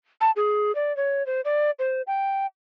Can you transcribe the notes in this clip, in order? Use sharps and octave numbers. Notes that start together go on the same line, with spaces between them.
A5
G#4
D5
C#5
C5
D5
C5
G5